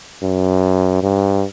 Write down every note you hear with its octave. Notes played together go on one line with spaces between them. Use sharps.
F#2
G2